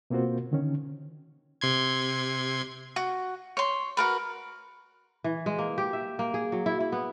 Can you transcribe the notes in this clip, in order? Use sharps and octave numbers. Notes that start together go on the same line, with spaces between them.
B2 A#3 C4 F4 F#4 C5
D3 D#3 C#4
C3 C6 G#6
F#4
C#5 C6
F#4 A#4 B4
E3
G#3
A#3
G4
E5
A#3
G#4
F#3
E4
E4
B3